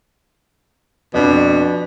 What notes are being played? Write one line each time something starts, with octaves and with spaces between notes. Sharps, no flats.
F2 B2 D4